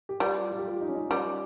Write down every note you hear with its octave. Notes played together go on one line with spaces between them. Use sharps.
G4
G3 F4
F4
G4
F4
D#4
C#4
D#4
G3 C#4